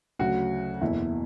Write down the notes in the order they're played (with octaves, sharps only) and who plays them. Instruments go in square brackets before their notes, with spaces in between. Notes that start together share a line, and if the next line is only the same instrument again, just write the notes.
[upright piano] D2 C#3 F#3 F#4
F#1 E2 B2 E4